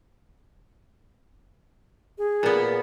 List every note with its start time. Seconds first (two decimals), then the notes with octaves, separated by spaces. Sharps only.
2.18 G#4
2.43 A#2 B3